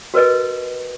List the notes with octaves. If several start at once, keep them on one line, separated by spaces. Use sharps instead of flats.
F#4 A#4 B4 D#5